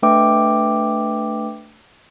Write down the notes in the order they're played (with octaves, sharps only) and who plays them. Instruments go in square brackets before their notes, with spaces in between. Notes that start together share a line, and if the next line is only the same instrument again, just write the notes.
[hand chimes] A3 D4 B4 E5 G5 D6